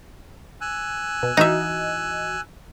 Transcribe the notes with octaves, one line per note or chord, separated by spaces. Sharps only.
G#5 E6 F#6
B2
E3 D#4 F#4 D#5 E5